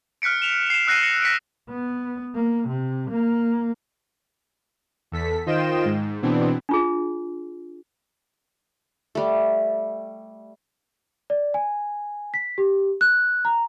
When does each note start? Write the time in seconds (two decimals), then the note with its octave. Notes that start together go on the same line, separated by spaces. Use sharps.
0.22 F6 F#6 B6 C#7 D7
0.42 E7 F7
0.70 C7 E7
0.87 E6 F#6 A#6 C7 D#7
1.03 A#6 C#7
1.22 A#6 B6 C#7 D7
1.69 B3
2.35 A#3
2.68 C3
3.10 A#3
5.12 E2 A4 B6
5.46 D#3 F4 C5 D#5 G5 E7
5.85 G#2
6.22 B2 E3 B3 C4 D4
6.69 D4 F4 G#4
9.15 G3 A3
11.30 D5
11.54 G#5
12.34 B6
12.58 G4
13.01 F#6
13.45 A#5